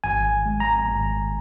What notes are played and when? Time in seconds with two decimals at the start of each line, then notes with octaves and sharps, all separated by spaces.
0.04 G#1 G#5
0.46 G#3
0.60 A#5
0.88 G#1